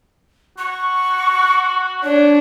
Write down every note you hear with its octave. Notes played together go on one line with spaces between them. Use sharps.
F#4 C#6
D4 C#5